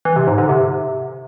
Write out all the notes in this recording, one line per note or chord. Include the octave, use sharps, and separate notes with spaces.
E3
C3
G#2
D3
C3